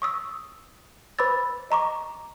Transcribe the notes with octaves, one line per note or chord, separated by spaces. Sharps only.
C#6 D#6 E6
B4 C5 B5 D6 E6 A6
D#5 A#5 C#6 D6